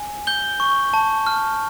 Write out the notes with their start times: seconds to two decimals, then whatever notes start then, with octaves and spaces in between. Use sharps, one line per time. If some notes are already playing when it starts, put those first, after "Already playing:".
Already playing: G#5
0.27 G6 G7
0.60 C#6
0.94 A5
1.27 F6